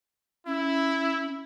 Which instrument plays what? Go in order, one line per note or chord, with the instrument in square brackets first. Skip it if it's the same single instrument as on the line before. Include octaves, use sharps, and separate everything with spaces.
[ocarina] C#4 [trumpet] E4